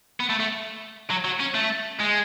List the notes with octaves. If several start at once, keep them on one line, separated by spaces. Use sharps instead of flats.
B3
A3
A3
F#3
F#3
C#4
A3
G#3